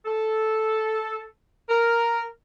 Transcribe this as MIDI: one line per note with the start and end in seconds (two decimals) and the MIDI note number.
0.05 1.23 69
1.69 2.22 70